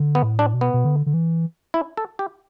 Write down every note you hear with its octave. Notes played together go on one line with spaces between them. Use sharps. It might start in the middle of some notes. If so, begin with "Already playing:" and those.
Already playing: D3
B3
A2
D4
B2
B3
B2
D3
D3
E3
E4
A4
G4